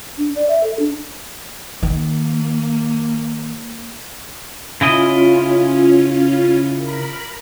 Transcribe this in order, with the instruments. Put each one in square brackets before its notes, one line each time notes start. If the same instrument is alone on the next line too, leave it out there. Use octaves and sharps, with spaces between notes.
[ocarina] D4
D5
E5
A4
D4
[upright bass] D#3 [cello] A#3
[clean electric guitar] C#3 E4 D#5 [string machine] C#4 F4
[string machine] A#4 B5